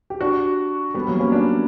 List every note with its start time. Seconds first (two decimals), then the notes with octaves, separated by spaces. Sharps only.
0.10 G4
0.21 D4 F#4
0.94 G3 B3
1.07 F#3 A#3
1.19 A#3 C#4
1.32 B3 D4